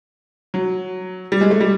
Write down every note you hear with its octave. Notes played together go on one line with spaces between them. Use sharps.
F#3
G3
G#3
A3
G3